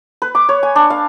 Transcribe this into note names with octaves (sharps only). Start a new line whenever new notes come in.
B4
D6
C#5
G#5
D4
F5